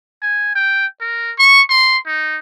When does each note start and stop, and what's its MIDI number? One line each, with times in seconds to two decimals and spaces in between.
0.22 0.51 80
0.55 0.86 79
1.01 1.32 70
1.38 1.61 85
1.70 1.98 84
2.06 2.39 63